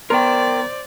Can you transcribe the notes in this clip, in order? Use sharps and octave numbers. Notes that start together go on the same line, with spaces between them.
B3 A#4 C5 D5 G5 A#5 C6